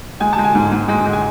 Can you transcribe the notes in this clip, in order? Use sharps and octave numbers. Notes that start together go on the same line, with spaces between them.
G#3 G#5
A5
G#3
G#5
G#2
G#2
G#3
G#3
G#5